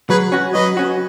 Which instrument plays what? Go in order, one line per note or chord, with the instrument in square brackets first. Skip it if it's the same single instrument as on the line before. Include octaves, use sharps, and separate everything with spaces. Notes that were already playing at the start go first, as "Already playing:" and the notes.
[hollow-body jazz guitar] F#3 [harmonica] G#4 B4
[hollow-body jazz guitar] C#4 F#4
[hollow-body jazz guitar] F#3 [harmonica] B4 D#5
[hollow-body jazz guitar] C#4 F#4